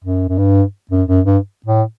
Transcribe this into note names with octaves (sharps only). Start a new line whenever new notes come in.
F#2
F#2
G2
F#2
F#2
G2
A2